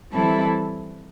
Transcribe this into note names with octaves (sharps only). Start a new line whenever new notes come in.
E3 G3 C4 E4 A4